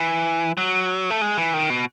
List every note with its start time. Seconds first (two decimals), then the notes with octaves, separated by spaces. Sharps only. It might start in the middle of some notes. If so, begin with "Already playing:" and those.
Already playing: E3
0.57 F#3
1.10 A3
1.21 G#3
1.38 E3
1.54 D#3
1.70 B2